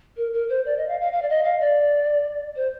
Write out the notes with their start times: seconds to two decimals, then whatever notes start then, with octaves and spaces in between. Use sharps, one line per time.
0.17 A#4
0.33 A#4
0.49 C5
0.65 D5
0.77 D#5
0.88 F5
1.01 F5
1.13 F5
1.22 D5
1.29 D#5
1.44 F5
1.60 D5
2.56 C5